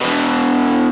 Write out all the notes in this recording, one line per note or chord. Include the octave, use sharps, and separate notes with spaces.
B2 E3